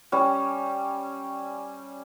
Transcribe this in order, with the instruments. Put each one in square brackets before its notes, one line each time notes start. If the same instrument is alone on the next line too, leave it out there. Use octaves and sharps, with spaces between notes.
[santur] G3 C#4